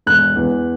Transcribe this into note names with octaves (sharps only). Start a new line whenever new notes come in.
E1 F#6
E2